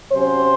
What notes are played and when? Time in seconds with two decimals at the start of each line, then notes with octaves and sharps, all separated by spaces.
0.11 C3 F#3 C#4 C5